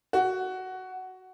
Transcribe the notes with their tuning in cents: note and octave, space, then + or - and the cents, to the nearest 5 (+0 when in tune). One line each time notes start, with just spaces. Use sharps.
F#4 +10